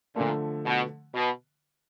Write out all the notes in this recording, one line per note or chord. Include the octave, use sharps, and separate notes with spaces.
A#2 D3 F3 A3
B2
B2